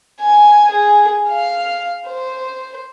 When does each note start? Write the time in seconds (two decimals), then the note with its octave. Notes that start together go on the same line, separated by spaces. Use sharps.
0.20 G#5
0.70 G#4
1.29 F5
2.07 C5